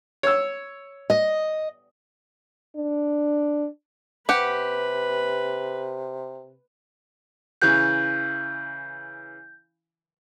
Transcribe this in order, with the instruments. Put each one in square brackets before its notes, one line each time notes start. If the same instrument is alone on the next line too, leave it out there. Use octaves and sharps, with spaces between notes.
[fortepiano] C#5 E6
[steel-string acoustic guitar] D#5
[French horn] D4
[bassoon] C3 [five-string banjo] G4 F#5 [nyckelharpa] B4
[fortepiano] C#3 E3 F#6 [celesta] G6